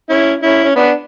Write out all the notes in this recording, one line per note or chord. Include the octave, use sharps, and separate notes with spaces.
C#4 E4
C#4 E4
C#4
B3 D4